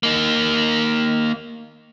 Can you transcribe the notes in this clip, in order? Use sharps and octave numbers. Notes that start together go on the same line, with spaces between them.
A#3 D#4